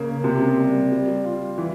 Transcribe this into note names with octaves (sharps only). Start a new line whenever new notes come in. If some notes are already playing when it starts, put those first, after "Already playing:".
Already playing: C#3 A#3
C3
G3
G3
F4
E3